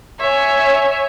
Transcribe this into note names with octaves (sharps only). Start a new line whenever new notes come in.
C#5 E5 G#5